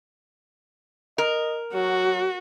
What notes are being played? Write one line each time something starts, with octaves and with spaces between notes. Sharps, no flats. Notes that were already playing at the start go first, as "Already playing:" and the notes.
A#4 D#5
F#3 F#4